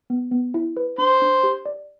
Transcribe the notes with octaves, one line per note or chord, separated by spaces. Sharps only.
B3
B3
E4
B4
D4 C5
D4
G4
D5